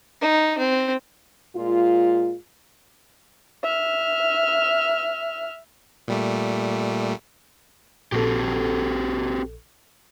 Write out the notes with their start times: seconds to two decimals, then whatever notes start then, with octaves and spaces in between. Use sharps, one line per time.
0.21 D#4
0.58 C4
1.56 A#2 G#3 F4
3.63 E5 F6
6.08 A#2 G3 A3
8.12 A#1 C4 F#4 G4 A4